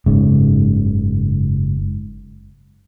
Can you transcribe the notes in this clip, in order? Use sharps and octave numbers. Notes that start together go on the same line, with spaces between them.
F#1 G#2 C#3